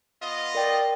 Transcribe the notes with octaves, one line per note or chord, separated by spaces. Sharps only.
B3 F4 D#5
A#4 D5 G5